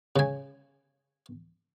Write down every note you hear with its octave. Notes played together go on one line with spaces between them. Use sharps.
C#3 G#5